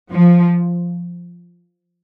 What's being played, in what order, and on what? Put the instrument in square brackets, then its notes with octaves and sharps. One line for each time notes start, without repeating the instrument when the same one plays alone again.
[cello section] F3